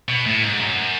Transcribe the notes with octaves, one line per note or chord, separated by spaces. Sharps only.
B2
A2
G#2
F#2